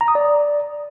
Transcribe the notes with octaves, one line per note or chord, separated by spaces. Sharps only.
A#5
D#6
D5